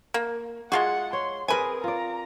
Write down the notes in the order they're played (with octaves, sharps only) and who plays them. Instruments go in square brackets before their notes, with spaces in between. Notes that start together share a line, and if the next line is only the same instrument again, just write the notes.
[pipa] A#3
[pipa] G#3 F4 F#4 [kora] G#4 [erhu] F#5
[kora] C#5 [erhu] C6
[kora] C4 A#4 [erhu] G#4 [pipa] B4 G#5
[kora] F4 D5 [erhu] A#5